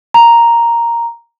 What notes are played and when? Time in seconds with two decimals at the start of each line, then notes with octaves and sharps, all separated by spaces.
0.14 A#5